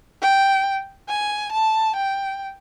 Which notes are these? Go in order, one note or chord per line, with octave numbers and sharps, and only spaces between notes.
G5
G#5
A5
G5